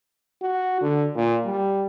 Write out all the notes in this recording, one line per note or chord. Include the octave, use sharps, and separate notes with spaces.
F#4
D3
A#2
G3